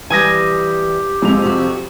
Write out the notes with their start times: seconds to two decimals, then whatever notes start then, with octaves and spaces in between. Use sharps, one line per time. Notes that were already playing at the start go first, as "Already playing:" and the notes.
0.10 E3 G3 G4 G#5 D#6 A#6
1.22 F2 G#3 F7
1.44 C3 F#4